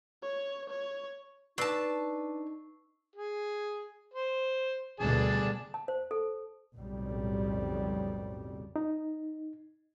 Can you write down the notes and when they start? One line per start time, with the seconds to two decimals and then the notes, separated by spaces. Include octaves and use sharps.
0.23 C#5
0.70 C#5
1.58 D4 D#4 B4 A5 C#6 E6 C7
3.16 G#4
4.14 C5
5.00 D2 B2 G3 G#4 D5 A5
5.74 A5
5.88 C5
6.11 A4
6.75 B1 F2 A2 C#3 G3
8.76 D#4